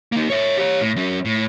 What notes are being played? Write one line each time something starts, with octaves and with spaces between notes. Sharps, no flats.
A#3 D#4
C#5 E5
G4 C#5
A2
F#3 C#4
A2